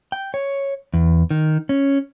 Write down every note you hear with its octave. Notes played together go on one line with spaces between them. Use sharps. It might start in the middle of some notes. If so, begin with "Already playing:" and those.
G5
C#5
E2
D#3
C#4